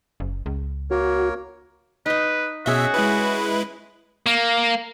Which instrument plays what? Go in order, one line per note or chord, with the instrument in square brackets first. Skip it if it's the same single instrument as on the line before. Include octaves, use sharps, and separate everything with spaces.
[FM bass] F#1
C#2
[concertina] A#3 A#4 C#5 [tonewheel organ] F#4
[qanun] D#4 D#5 [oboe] B4
[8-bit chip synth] B2 E5 [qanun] C#4 G#4 D#5 [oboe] F#4
[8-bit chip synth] G#3 E4 B4
[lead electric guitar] A#3